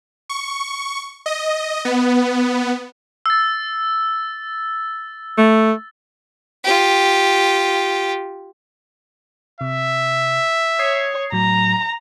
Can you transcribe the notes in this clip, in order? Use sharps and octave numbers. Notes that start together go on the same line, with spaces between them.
C#6
D#5
B3
E6 A6
A3
F4 G4
C3 E5
C#5 D#6 G#6 C7
A2 F#3 A#5